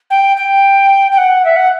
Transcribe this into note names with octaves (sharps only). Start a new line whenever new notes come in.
G5
G5
G5
F#5
E5
F#5